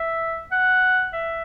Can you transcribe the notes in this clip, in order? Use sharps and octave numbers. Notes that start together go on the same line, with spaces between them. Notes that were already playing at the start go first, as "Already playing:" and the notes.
Already playing: E5
F#5
E5